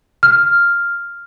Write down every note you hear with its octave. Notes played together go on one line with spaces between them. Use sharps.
F6